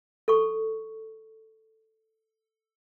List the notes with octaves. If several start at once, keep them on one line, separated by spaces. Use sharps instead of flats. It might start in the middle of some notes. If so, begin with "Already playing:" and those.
A4 C#6